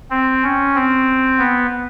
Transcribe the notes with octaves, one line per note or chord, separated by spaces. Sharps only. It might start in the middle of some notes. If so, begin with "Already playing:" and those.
C4
C#4
C4
B3